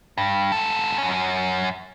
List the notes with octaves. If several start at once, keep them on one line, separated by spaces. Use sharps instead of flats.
G2
G#2 A4
F#2 C#4